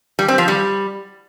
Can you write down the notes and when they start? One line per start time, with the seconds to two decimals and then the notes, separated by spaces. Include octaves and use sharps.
0.19 G3
0.28 C4
0.38 F3
0.48 G3